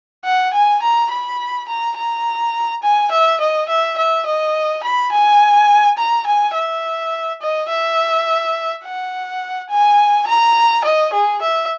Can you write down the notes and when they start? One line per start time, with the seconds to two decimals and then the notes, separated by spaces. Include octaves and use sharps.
0.25 F#5
0.53 G#5
0.82 A#5
1.11 B5
1.68 A#5
1.97 A#5
2.82 G#5
3.11 E5
3.40 D#5
3.68 E5
3.97 E5
4.26 D#5
4.83 B5
5.12 G#5
5.98 A#5
6.26 G#5
6.55 E5
7.41 D#5
7.69 E5
8.84 F#5
9.69 G#5
10.27 A#5
10.84 D#5
11.13 G#4
11.41 E5